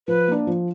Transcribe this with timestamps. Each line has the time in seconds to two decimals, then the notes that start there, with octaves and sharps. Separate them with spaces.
0.08 F3 B4
0.28 A#3 D4
0.47 F3